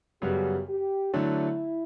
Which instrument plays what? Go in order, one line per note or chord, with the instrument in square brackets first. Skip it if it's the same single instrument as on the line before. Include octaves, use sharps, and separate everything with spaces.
[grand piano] F#2 C#3 G3 B3 F#4 [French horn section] G4
[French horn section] G4
[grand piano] D3 F#3 A3 D4 [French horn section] E4